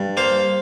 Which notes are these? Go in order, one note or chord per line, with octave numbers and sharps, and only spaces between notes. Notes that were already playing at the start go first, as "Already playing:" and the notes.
Already playing: G2
A#3 C5 F5